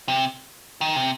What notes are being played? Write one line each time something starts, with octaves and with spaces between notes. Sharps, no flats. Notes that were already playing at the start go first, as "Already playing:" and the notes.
C3
D#3
C3